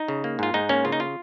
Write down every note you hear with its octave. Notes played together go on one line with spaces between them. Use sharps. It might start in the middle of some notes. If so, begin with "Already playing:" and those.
Already playing: D#4
C#3
A#3
G#2 F4
G#2 D#4
A#3 C#4
C#3 F4
D#4
F4